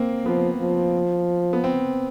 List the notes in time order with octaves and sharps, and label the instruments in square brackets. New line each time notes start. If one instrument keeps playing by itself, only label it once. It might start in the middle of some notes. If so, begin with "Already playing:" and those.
Already playing: [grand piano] A#3 C4
[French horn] F3 [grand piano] B3
[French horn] F3
[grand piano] B3
C4